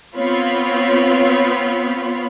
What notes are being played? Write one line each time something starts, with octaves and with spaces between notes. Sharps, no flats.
B3 C4 F4 C#5 B5